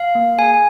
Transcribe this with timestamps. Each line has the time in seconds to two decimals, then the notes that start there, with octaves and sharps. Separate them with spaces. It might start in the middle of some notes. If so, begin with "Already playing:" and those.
Already playing: F5
0.15 A#3
0.39 G#4 G#5